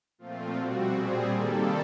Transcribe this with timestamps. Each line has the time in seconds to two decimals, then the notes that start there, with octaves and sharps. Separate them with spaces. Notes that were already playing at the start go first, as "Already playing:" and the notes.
0.18 A#2 F3 A3 C4 F4
0.55 B2 G3 C4 F#4
0.91 A#2 G3 C4 G#4
1.28 C3 D#3 G3 A#3 A4